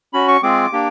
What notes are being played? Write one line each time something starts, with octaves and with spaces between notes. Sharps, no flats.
C#4 F#4 B5
C#6
G#3 C4 F4 G#4 D6
A#3 D4 G4